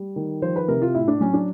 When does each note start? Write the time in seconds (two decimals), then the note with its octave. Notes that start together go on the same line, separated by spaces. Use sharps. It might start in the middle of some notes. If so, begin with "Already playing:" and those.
Already playing: G3
0.16 D#3
0.42 F3 C5
0.56 B4
0.68 C3 A#4
0.82 F4
0.95 A2 E4
1.08 D4
1.21 F#3 C#4
1.34 D4